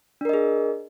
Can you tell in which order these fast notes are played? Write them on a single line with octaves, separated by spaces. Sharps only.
D4 A#4 D#5 G#4